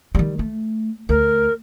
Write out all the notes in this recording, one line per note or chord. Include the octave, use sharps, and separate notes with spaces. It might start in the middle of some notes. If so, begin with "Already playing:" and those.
D#3 G3
A3
D2 A#4